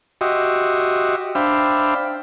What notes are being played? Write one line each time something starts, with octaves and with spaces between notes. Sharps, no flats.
F#4 G4 D#5 E5 C6
D4 C5 E5 F5 G5 B5